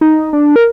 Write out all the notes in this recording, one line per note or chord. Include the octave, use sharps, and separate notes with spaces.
D#4
D4
A#4